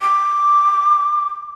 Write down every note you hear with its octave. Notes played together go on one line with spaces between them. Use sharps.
D6